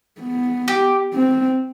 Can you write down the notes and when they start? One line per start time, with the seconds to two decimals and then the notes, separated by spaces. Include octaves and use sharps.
0.21 B3
0.68 G4
1.14 C4